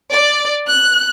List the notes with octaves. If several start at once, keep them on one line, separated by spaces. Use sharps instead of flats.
D5
F#6